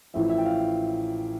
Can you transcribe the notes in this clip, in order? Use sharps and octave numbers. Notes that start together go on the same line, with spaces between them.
A1 A2 F3 E5
E5
G5
F5